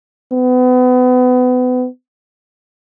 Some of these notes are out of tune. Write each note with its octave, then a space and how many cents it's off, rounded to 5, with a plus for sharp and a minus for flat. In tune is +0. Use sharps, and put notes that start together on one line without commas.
B3 +30